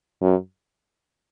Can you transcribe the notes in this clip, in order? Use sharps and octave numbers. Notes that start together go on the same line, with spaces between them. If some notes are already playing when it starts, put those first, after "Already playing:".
F#2